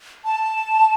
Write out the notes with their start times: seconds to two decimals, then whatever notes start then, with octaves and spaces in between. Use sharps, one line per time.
0.25 A5